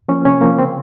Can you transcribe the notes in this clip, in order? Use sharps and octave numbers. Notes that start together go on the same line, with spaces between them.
F3 A#3 C#4
C3 C#4
F3 A#3
C#3 C4